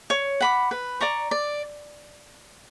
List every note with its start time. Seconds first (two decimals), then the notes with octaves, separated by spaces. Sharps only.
0.10 C#5
0.41 F#5 B5 D6
0.71 B4
1.00 D5 A#5 C#6
1.31 D5